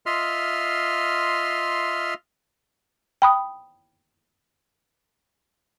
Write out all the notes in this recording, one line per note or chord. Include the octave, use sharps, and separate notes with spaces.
F4 D#5 E5 C6 F6
G5 B5 D#6